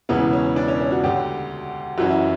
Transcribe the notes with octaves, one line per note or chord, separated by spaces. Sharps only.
E1 E2 C#3 E3 B3
C#4
D4
C#4
C#4
F#4
D2 D3 G4
F#1 F#2 E3 F#4
E4